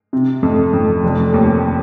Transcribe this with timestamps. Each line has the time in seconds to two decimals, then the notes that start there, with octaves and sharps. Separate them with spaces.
0.13 C3
0.43 F2
0.73 F2
1.04 F1
1.34 D#2